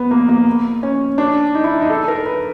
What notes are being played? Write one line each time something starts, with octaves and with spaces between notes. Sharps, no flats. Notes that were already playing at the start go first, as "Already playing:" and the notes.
Already playing: B3
A#3
A#3
C#4
D4
D#4
E4
D#4
A4
A#4
B4